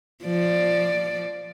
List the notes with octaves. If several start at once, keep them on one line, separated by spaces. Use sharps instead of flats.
F3 D5